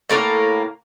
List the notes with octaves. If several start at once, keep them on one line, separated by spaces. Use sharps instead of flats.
A2 A#3 D#4 A#4